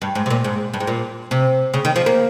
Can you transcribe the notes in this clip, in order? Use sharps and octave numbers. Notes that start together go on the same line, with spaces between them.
G2
G#2
C3
A#2
G#2
G2
G#2
A#2
C3
C#3
D#3
F3
A#3